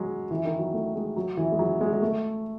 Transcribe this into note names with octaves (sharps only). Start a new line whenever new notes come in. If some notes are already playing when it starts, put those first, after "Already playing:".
Already playing: F#3 G#3
E3
D#3
F#3
A3
G#3
F#3
E3
G#3
F#3
G#3
G#3
A3